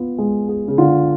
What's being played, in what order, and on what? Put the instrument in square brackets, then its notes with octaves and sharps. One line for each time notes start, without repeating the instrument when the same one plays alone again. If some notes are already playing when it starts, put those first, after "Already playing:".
Already playing: [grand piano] B3 F4
G#3
G#4
[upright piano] C#3
[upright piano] D3 [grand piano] F4